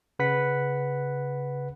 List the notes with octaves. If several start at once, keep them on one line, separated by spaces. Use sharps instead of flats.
C#3 B4 F#5 B6